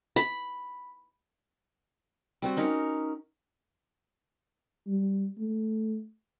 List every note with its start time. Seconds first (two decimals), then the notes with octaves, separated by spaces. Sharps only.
0.16 B5
2.42 G3 C4 F#4
2.57 C#4 D#4 A#4 C#5
4.88 G3
5.38 A3